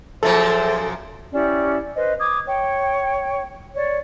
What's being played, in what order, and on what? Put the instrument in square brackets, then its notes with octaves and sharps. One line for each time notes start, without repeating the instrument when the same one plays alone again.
[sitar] F#2 A#2 F3 [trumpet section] G#4 C5 E5 [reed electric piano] A4 A6
[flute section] C#4 E4 G4 D5
B4 C5 D#5
D6 D#6 G#6
C#5 G5
C#5 D5